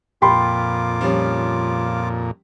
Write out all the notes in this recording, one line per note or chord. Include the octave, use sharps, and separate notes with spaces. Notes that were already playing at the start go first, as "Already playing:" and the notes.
F2 A#2 F4 G5 B5 C6 D6
F3 G3 C#4